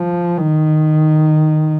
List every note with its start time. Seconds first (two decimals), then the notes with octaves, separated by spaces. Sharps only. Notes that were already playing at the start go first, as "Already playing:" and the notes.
Already playing: F3
0.37 D#3